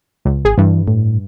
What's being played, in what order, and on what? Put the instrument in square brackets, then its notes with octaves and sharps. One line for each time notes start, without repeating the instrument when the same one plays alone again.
[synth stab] C#2
[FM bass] G#1 [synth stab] G#4
[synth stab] G2 [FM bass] E3
[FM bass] A2